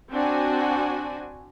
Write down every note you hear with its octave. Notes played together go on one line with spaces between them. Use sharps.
C4 D4 F#4 G#5